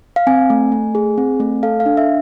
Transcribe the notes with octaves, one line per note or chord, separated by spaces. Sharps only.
F5
C4 G#5
A3
A3
G#4
C4
A3
A4 F5
F5
D4
E5